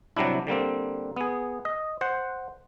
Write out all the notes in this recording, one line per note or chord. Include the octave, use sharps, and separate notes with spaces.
C3 F#3 G3 D4 E4
D3 G3 A#3 C4
B3 G#4
D#5
C5 F#5